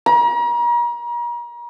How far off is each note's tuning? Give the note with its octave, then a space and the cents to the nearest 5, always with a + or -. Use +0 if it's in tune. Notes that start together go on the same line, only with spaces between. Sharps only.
A#5 +40